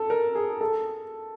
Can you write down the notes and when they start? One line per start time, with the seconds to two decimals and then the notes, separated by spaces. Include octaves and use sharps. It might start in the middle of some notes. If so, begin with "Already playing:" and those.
Already playing: A4
0.10 A#4
0.35 G#4
0.61 A4